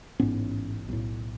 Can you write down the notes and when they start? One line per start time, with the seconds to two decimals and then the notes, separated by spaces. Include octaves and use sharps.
0.19 A1 G#2 B3 C#4
0.89 B1 A2